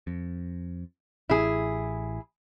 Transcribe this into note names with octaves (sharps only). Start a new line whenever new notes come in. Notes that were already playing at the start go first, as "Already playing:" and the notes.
F2
A1 E4 G#4